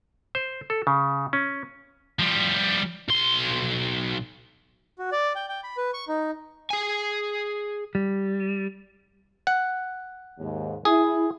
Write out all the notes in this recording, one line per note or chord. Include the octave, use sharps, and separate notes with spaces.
C5
A4
C#3
C#4
F3 G3
B1 C6
F#4
D5
G5
G5
B5
B4
C#6
D#4
G#4 G#5
G3
F#5
D#2 G#2
E4 G#4